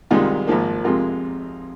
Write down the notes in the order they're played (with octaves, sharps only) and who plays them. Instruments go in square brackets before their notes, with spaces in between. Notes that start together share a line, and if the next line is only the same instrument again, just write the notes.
[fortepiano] C2 C3 D#3 G#3 F4
G#1 G#2 F3 A#3
F2 C3 G#3 F4 A#4